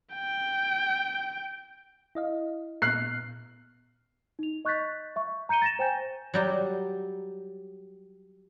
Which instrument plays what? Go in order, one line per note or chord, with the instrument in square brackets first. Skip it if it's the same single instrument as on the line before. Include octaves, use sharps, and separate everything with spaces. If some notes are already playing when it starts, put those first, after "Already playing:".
[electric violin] G5
[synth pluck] E4 D#5 F5
[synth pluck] A#2 B3 [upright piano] F6 F#6 C7
[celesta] D#4 F7
D#5 C#6 F#6 G6 A6 B6
E5 C#6
A#5 G6 C#7 D#7 G7
A6 A#6 E7
C5 G5 G#5 G6
[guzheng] F#3 G3 G4